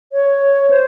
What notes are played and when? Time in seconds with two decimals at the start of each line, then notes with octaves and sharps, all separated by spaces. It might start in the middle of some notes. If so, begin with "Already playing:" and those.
0.13 C#5
0.70 C5